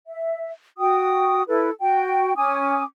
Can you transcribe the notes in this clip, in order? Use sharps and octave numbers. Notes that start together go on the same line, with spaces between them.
E5
F#4 G5 D#6
E4 A4 B4
F#4 G5
C#4 G#5 D6 D#6